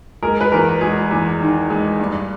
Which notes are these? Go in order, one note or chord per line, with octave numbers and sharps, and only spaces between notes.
G#3 A#4
B4
E2 A#4
G#3 G#4
E2
D#3
G#3
G2